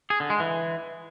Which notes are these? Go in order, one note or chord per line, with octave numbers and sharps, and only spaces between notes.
G#4
D3
G#3
E3